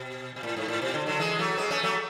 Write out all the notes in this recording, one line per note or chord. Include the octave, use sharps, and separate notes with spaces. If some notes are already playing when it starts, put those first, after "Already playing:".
Already playing: B2
B2
A2
G#2
A2
B2
D3
D3 F#3
E3 G#3
F#3 A3
G#3 B3
A3 C#4
F#3 A3